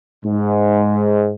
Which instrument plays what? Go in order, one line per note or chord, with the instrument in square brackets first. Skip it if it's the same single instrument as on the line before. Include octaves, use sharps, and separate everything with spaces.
[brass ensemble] G#2